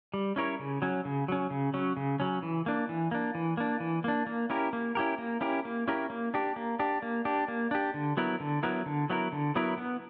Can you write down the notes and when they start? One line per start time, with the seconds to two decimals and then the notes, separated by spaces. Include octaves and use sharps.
0.14 G3
0.36 C#4 E4 A#4 C#5
0.59 C#3
0.82 F#3 C#4
1.05 C#3
1.28 F#3 C#4
1.50 C#3
1.74 F#3 C#4
1.97 C#3
2.20 F#3 C#4
2.42 E3
2.66 A#3 D4
2.89 E3
3.11 A#3 D4
3.35 E3
3.57 A#3 D4
3.80 E3
4.04 A#3 D4
4.27 A#3
4.50 C#4 E4 G4 A#4
4.73 A#3
4.95 C#4 E4 G4 A#4
5.18 A#3
5.41 C#4 E4 G4 A#4
5.65 A#3
5.88 C#4 E4 G4 A#4
6.10 A#3
6.34 D4 G4
6.56 A#3
6.79 D4 G4
7.02 A#3
7.25 D4 G4
7.48 A#3
7.71 D4 G4
7.94 D3
8.17 F#3 B3 E4 A#4
8.40 D3
8.63 F#3 B3 E4 A#4
8.86 D3
9.10 F#3 B3 E4 A#4
9.32 D3
9.55 F#3 B3 E4 A#4
9.78 B3